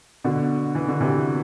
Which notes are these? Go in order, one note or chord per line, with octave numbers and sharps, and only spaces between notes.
B2 D3
E3
D3
C3 E3